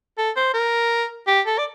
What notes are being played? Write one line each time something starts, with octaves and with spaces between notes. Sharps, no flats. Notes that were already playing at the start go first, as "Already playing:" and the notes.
A4
C5
A#4
G4
A4
D5